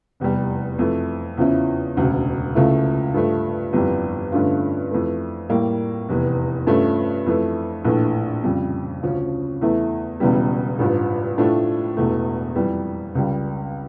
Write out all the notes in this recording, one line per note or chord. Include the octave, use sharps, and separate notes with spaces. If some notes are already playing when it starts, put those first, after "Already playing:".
F1 E2 E3 G3
F2 E3 A3
E2 C#3 F3 C#4 E4
E1 D2 C#3
C#2 C#3 F3 A3 E4
G2 F3 A3
G1 F2 E3 G3
G2 D3 A3 C#4 F4
F2 E3 A3
A2 G3 A#3
F1 E2 E3
G2 F3 A3 C#4
F2 E3 A3
A#1 A2 E3 A3 D4
F2 C#3 G3
D2 C#3 F3 C#4
E2 E3 A3 E4
E1 E2 C#3 E3 G3
A1 G2 F3
A2 F3 A3 D4
E1 E2 E3 A3
F2 E3 G3
C#2 C#3 G3